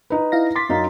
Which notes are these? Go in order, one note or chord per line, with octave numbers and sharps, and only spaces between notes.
D#4 B4
E4 F5 A#6
C6 D6 A6 B6
F#2 D#4 F5